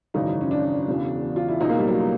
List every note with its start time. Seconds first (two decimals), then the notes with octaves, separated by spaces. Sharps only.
0.14 G#1 F#2 C#3 E3 D#4
0.41 C#4
0.51 D4
0.87 E1 E2 C#3
1.36 F4
1.48 E4
1.60 C#2 B2 D#4
1.69 A#3
1.79 G3
1.88 F#3